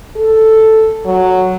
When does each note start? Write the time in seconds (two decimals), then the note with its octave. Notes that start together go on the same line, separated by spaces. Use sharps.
0.16 A4
1.05 F#3